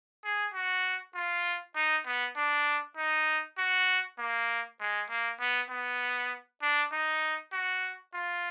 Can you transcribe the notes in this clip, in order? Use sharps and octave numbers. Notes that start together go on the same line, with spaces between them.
G#4
F#4
F4
D#4
B3
D4
D#4
F#4
A#3
G#3
A#3
B3
B3
D4
D#4
F#4
F4